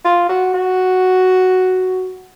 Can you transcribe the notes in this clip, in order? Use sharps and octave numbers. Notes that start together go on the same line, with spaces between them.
F4
F#4
F#4